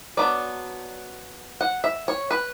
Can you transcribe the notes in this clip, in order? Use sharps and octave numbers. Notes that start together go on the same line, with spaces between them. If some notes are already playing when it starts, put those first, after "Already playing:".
F#3 B3 D4 D5
F#5
E5
C#5
B4